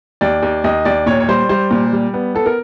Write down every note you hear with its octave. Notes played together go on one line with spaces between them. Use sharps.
D#2 D5
D#2
D#2 D#5
D#2 D5
A#2 C#5
C#5
G3 C5
G3 C5
A#2
G3
B3
B3 A4
A#4